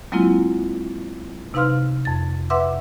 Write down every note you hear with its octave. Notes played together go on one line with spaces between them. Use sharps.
F#3 G#3 A#3 C4 E4 F4
C3 D#4 B4 F5 C6 F6
F2 A6
B4 E5 F#5 C6 D6 E6